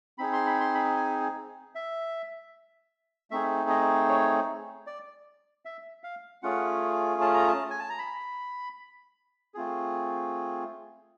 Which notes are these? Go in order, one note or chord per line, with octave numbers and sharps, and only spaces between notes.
C4 D#4 G#4 B5
C6
B5
C6
B5
G#5
E5
A3 C4 D#4 G#4 E5
D#5
C#5
D5
E5
F5
A3 C#4 F4 G#4 F#5
A5
A#5
A5
G#5
A5
A#5
B5
A3 C4 F4 G#4